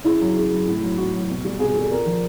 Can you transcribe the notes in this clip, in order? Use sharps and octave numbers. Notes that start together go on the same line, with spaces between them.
C#3 E4
F#3
C#3
F#3
A2
F#3
A2 F#4
F#3
B2
G3
B2 G#4
G3 A4
A#2 A#4
F3